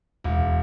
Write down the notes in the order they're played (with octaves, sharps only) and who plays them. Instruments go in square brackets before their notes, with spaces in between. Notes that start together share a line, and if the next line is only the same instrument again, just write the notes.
[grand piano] E1